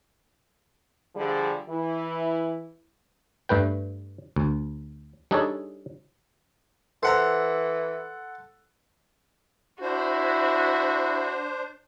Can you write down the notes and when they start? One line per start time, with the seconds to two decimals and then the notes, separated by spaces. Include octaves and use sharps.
1.15 D3 F3 G3 G#4
1.68 E3 E4
3.49 G2 A3 B4 G5
4.36 D2
5.31 G3 D4 D#4 G#4 A4 C#5
7.03 E3 A4 C5 E5 F#5 A#5
9.81 D4 E4 F#4 C5